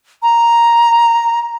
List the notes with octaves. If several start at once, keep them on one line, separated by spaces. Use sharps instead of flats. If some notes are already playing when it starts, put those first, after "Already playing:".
A#5